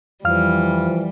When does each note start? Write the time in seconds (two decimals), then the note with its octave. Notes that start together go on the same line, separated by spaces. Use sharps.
0.24 F2 E3 F3 G3 F5 F6